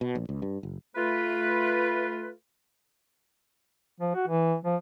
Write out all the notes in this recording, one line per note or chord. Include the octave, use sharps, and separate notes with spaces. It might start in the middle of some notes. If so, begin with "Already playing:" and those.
B2
A#1
C#2
G2
F#1
A3 F4 B4
F3
F#4
E3
F3